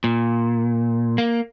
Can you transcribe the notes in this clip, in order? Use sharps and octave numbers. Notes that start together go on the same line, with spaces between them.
A#2
A#3